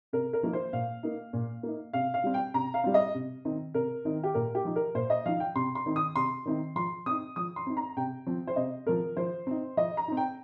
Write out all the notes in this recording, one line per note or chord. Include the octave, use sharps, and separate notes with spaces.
C3 A#4
A#4
F3 A#3 D#4
C5
A#2 F5
A#3 D#4
A#2
A#3 D#4
C3 F5
F5
G3 C4
G5
C3 A#5
F5
G3 C4
D#5
C3
D#3 C4 D#4
C3 A#4
D#3 C4 D#4
G4
A#2 A#4
G4
F3 D#4
A#4
A#2 C5
D#5
F3 D#4 F5
G5
C3 C6
C6
D#3 C4 D#4
D#6
C3 C6
D#3 C4 D#4
F3 C6
C4 D#4 D#6
F3 D#6
C6
C4 D#4
A#5
C3 G5
F3 C4
C5
C3 D#5
F3 C4 A#4
F3 C5
C4 D#4
F3 D#5
A#5
C4 D#4
G5